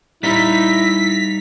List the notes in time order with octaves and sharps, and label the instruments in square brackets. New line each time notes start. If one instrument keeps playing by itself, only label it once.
[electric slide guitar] G3 D#4 [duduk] E4 [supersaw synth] B6